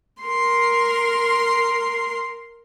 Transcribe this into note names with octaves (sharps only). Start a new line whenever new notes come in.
A#4 C6